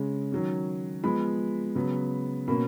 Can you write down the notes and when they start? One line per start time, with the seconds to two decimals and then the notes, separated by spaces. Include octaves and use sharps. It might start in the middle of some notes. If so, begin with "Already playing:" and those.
Already playing: C#3 G#3 C#4
0.32 D#3 F#3 C#4
1.04 F3 G#3 B3 B5
1.75 C#3 F#3 B3
2.48 B2 A#3 C#4 B5